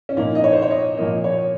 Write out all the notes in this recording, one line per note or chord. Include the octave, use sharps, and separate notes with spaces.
C#4
A#2 F3 A#3 D#4
D#5
C#5
C5
C#5
D#5
A#2 F3 A#3 D#5
C#5